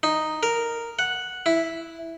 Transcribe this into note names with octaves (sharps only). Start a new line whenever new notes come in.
D#4
A#4
F#5
E4